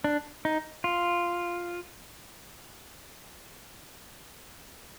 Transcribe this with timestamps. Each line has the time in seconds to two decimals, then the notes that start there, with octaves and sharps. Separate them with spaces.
0.04 D4
0.45 D#4
0.84 F4